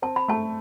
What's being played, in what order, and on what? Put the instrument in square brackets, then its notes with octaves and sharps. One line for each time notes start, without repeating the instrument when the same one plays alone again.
[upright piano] C4 [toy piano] A5
[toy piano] B5
[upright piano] A3 [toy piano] A5